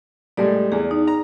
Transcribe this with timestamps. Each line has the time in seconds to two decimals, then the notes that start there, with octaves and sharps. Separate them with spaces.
0.37 A2 G3 G#3 D5
0.72 E2 G#4
0.91 D#4
1.07 A#5